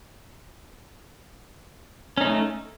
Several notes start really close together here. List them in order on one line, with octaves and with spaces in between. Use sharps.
C#4 D#4 A3